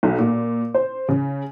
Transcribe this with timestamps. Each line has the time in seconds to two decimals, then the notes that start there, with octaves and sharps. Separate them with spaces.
0.03 B1
0.19 A#2
0.74 C5
1.09 C#3